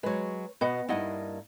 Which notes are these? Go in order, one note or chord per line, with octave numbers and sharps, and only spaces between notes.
F#3 G#3 B4 C#5
B2 B4 D#5 F#5
G2 A#3 D#4 E4 D#5 F#5